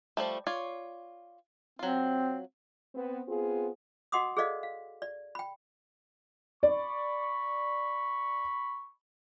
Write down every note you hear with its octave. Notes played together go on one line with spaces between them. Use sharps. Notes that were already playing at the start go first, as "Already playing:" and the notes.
F3 G3 A3
F4 C#5 D5
F#3 C4 F4
B3 C4
B3 C4 F4 G#4
F#4 D#5 F#5 C6 D6 D#6
G#4 A4 C5 D5 D#5 F5
F5
D5
G5 B5
D5 B5 C#6